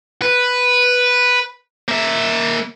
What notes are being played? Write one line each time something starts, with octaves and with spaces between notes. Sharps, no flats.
B4
A#3 E5